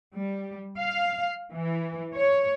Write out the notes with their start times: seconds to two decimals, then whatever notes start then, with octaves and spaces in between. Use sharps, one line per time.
0.15 G3
0.79 F5
1.52 E3
2.16 C#5